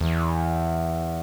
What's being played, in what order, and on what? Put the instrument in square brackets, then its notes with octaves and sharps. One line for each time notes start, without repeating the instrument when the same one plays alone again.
[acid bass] E2